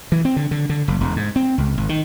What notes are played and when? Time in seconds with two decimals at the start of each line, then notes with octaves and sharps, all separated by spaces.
0.12 E3
0.25 C4
0.36 D3
0.51 D3
0.69 D3
0.88 F#1
1.01 E1
1.16 G#2
1.36 C4
1.58 C#2
1.78 G#1
1.89 D#3